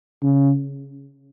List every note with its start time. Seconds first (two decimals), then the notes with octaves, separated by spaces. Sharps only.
0.23 C#3